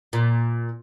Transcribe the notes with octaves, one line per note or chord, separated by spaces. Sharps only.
A#2